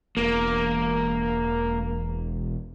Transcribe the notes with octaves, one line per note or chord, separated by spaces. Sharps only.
E1 A#3